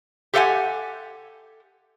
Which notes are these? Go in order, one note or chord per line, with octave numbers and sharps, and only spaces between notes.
G4 A4 C5 E5 F#5 G#5